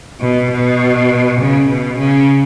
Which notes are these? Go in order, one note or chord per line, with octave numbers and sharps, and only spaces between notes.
B2
B2
C#3
B2
C#3